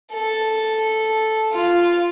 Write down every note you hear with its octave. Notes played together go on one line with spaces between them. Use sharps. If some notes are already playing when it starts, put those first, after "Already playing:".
A4
F4